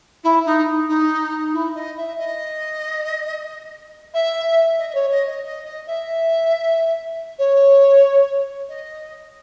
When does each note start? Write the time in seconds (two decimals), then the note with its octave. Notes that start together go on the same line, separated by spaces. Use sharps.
0.24 E4
0.46 D#4
0.89 D#4
1.53 E4
1.76 D#5
1.97 E5
2.19 D#5
4.14 E5
4.79 D#5
4.90 D#5
4.95 C#5
5.11 D#5
5.28 D#5
5.44 D#5
5.65 D#5
5.87 E5
7.39 C#5
8.69 D#5